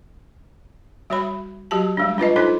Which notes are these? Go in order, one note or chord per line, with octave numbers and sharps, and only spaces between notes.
G3 F#4 C#5 E5 B5
F#3 F#4 G4 A5
G3 G#3 D4
D4 F4 B4 D#5
D4 D#4 F4 A4 C5